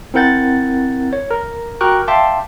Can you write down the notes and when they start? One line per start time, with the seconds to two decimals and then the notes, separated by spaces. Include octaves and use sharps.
0.14 C4 E4 A#4 F#5 G6 A6
1.13 C#5
1.30 A#4
1.81 F#4 A#4 G5 C#6 D6 F#6
2.08 E5 F5 G5 A5 C6 D6